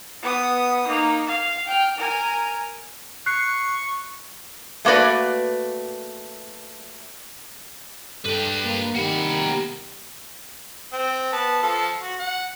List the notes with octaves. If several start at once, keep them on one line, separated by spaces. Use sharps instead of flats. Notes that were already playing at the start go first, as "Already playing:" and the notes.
B3 D#6
A#3 D#4
F5
G5 F6
A#4 G#5
C#6 F#6 C7
A3 A#3 F#4 B4 D5
G2 A4 B4 G5
A#3
C2 D#3 A#3 G4 F#5 B5
C4
B3 A5
F3 A4
F#4
F#5